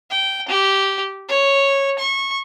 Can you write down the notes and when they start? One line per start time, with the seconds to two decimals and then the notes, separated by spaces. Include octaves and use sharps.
0.11 G5
0.49 G4
1.29 C#5
1.99 C#6